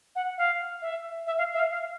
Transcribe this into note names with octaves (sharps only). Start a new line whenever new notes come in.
F#5
F5
E5
E5
F5
E5
F5
F5